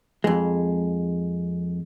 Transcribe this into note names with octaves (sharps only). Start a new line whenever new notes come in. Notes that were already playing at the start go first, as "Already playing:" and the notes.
F2 G#3